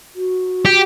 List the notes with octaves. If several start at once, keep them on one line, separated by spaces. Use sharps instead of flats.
F#4
G4